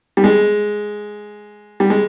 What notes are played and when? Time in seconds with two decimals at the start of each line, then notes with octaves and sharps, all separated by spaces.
0.17 G3
0.24 G#3
1.80 G3
1.90 G#3